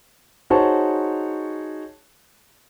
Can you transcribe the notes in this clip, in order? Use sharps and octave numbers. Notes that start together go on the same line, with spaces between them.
D#4 F#4 G#4 C5 C#5 A5